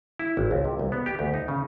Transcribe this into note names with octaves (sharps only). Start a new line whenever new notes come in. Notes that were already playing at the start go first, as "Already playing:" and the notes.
E4
G#1
C#2
C3
C2
B3
G4
D2
D#4
C#3